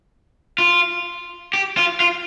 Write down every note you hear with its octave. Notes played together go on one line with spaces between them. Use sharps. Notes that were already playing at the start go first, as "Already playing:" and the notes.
F4
G4
F4
F4